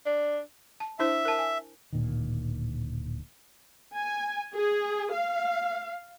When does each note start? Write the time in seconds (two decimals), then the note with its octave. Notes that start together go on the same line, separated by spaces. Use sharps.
0.06 D4
0.80 A5
0.99 D4 E4 C5 E5
1.25 A#4 A5
1.39 G#5
1.93 D1 A#2 D#3
3.96 G#5
4.55 G#4
5.13 F5